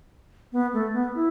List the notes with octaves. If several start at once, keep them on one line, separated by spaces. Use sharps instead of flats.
B3
A3
B3
E4